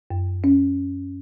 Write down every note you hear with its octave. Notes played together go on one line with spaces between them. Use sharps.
F#2
C#4